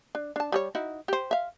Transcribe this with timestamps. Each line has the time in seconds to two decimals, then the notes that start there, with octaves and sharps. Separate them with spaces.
0.15 D4
0.36 D4 A5
0.52 G3 G#4 C#5
0.75 D#4 E4 F#4
1.08 G4 C5
1.31 E5 F5